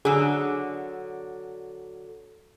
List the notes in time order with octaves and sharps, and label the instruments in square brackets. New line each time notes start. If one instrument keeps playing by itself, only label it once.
[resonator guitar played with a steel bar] D3 F#3 [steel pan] G#4 E6